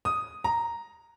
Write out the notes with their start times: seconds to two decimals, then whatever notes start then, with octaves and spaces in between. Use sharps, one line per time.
0.05 D#6
0.44 A#5